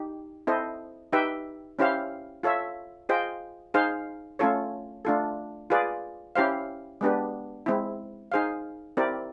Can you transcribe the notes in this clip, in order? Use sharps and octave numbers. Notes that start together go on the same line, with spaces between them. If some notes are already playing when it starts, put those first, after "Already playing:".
Already playing: D#4 G4
C4 E4 A4 C5 D#5
D#4 G4 B4 E5 G5
C#4 E4 G4 C5 F5
F4 A4 C#5 E5
F4 G#4 C5 D#5 G5
D#4 G#4 C5 F5
A3 C#4 F4 A4 C#5
A3 D4 F4 A4
F4 G#4 B4 D5
C#4 E4 G4 C5 F5
G#3 B3 D4 G4 B4
G#3 C4 E4
D#4 G#4 C5 F5
C4 E4 G4 A#4 D5